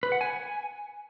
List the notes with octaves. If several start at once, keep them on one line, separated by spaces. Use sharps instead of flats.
B4
F#5
G#5